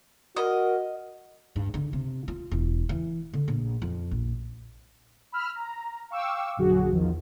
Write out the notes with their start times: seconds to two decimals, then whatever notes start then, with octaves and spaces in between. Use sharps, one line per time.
0.36 F#4 A#4 D#5
1.56 G2
1.74 D3
1.93 C3
2.28 F4
2.51 E1
2.89 E3
3.33 D3
3.48 A#1
3.82 F2
4.11 A#1
5.32 B5 E6 F6
5.55 A#5
6.11 F5 G5 C#6 D6 E6
6.57 A#1 F#2 D3 F#3 F#4 G#4
6.91 E2 D#3 F3